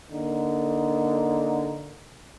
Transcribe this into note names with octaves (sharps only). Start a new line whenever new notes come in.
D3 A#3 D#4